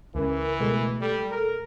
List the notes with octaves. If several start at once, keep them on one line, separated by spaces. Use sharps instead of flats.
C#2 C#3 E3 A#4
B2 G#3 A3
G3 A4
A#4